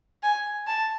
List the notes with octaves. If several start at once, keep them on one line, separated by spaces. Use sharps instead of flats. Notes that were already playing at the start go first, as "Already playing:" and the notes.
G#5
A5